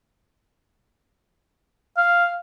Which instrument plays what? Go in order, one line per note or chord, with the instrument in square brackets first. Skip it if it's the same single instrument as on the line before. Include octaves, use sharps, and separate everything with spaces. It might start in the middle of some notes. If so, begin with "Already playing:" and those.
[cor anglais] F5